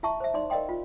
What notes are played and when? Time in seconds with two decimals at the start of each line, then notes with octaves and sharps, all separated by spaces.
0.03 E4 E5 A5 C#6
0.20 C5 E5
0.34 D#4 D5 C6
0.50 A#4 D5 D#5 F5 G5 C6
0.69 F4